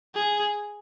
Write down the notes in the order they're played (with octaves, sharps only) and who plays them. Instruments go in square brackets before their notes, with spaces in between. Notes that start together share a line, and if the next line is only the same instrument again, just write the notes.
[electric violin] G#4